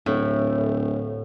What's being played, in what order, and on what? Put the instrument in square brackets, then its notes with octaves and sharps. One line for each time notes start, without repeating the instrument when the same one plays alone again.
[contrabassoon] D1 [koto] A2